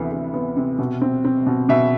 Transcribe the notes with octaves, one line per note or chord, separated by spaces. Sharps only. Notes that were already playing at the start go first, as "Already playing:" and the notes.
Already playing: D2 C3 E3 B3
D2
B3
C3
B2
C4
C4
B2
B2 E5